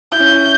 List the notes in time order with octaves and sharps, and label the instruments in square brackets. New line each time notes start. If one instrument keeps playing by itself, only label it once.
[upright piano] E4 [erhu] G6
[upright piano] C#4
E4